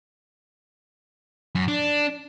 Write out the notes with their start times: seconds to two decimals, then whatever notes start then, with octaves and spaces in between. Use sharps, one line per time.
1.55 F#2
1.68 D4